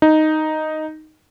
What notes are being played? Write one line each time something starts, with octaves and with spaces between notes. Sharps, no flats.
D#4